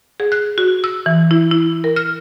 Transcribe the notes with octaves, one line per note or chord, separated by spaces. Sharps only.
G#4
F#6
F#4
E6
E3
E4
E4
A#4
F6